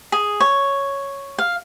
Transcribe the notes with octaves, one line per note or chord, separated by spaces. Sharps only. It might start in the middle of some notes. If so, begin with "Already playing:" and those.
G#4
C#5
F5